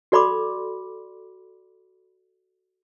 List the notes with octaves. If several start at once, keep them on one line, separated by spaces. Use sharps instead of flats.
F#4 A4 D5 B5 C6 D6